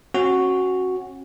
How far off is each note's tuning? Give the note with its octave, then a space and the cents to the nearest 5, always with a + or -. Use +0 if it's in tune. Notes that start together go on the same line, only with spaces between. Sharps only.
C#4 -35 F#4 +0